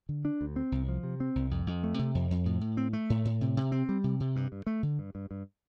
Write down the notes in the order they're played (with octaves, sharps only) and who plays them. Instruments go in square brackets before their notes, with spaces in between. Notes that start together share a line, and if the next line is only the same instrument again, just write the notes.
[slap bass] D3
D4
D2
C4
C2
F3
C3
C4
C2
F2
F2
A3
C3
F2
F2
A2
A2
C4
A3
A2
A2
C3
C3
C4
G3
C3
C3
G2
G2
A3
D3
G2
G2
G2